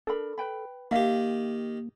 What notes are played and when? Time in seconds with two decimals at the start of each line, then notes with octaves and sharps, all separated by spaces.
0.07 D4 A4 A#4 B5
0.38 B4 G5 B5
0.91 D#3 A#3 G4 E5 F5